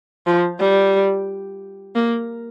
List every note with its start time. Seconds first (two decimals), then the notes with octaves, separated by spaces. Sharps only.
0.26 F3
0.59 G3
1.95 A#3